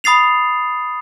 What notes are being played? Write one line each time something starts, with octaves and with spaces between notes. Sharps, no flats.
B5 D#6 A6 C7 F7